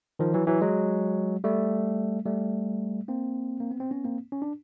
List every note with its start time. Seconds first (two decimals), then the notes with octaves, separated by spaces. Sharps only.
0.19 D#3 F3
0.34 E3 F#3
0.47 E3 F#3
0.61 F#3 G#3
1.44 G3 A3
2.25 G3 A3
3.08 A#3 C4
3.60 A#3
3.71 B3
3.80 C4
3.91 B3 C#4
4.05 A#3 C4
4.32 C#4
4.42 D4